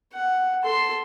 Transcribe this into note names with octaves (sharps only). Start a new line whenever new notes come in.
F#5
A4 C6